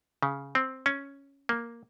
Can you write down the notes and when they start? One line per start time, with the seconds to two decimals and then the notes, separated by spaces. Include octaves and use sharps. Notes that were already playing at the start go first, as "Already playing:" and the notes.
0.23 C#3
0.55 C4
0.86 C#4
1.49 A#3